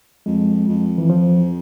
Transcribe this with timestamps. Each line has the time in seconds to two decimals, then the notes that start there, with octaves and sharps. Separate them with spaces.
0.26 F2 G#3
0.68 F2
0.98 E3
1.09 F3